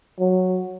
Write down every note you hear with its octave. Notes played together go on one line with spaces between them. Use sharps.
F#3